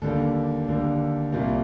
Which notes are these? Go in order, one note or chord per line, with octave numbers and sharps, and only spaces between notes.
D#2 D3 G3 A#3 A4
D#2 D3 G3 A#3
C2 A#2 G3 A#3